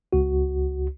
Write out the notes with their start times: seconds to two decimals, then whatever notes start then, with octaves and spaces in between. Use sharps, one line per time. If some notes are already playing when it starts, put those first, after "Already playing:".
0.13 C#2 F#4